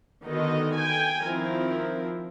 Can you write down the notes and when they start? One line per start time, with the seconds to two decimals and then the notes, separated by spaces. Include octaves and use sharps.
0.23 D3 D#3 B3 F#4 A4 D#5
0.75 G5 G#5
1.23 D#3 F3 C4 E4 A#4